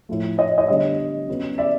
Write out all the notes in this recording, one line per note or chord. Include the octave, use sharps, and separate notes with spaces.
A2 F3 A3
C#5 D#5
C#5 D#5
D3 G3 B3 C#5 D#5
C#3 F#3 B3
D5 E5